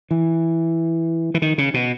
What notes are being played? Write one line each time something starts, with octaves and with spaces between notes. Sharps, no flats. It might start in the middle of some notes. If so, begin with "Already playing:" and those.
E3
E3
D#3
C#3
B2